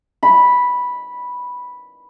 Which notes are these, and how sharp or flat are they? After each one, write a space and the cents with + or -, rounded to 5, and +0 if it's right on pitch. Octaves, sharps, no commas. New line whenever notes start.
B5 -5